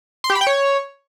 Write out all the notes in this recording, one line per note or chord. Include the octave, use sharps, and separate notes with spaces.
C6
G4
B5
G5
C#5